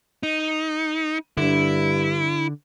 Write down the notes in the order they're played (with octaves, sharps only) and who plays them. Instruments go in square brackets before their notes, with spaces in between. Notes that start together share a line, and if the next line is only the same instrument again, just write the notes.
[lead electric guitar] D#4
[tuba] G2 [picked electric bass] D3 [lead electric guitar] E4